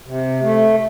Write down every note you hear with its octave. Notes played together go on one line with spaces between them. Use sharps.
C3
A3